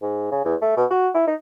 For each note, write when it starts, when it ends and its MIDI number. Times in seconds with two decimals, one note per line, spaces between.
0.02 0.30 44
0.32 0.42 49
0.45 0.55 40
0.62 0.76 57
0.77 0.85 47
0.91 1.09 66
1.15 1.22 64
1.27 1.35 63